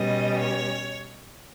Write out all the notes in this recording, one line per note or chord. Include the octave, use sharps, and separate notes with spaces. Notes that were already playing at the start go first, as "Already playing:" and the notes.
Already playing: B2 G3 C#4 D#5
C#5